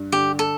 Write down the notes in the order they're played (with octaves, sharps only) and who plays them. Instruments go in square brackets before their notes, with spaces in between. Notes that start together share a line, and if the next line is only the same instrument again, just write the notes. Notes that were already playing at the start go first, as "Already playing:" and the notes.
Already playing: [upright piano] G2
[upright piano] D3 [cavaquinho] G4
[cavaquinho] A4